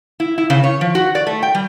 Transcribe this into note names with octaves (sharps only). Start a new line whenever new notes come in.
E4
E4
C#3
C#5
F3
F#4
D5
A3
G5
G3